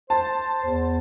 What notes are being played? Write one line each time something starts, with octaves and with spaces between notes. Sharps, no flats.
C5 A5
E2